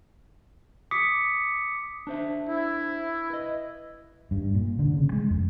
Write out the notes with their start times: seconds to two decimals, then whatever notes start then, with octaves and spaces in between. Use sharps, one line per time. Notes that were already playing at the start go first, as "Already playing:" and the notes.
0.91 D6 D#6 B6 C#7
2.07 D4 C5 E5
2.49 E4
3.30 B4 D#5
4.31 G2
4.55 A#2
4.79 D3
4.93 C#3
5.13 G#3
5.30 F2